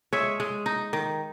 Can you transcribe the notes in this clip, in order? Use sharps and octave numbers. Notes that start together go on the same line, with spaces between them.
G#3 C#5 E5
G#3
D#4
D#3